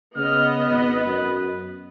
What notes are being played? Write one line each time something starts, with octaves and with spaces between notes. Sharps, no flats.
C#3 B3 D#5 F6
G#1 B4
F#2